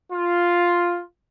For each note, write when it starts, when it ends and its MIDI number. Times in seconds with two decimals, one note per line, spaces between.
0.13 1.02 65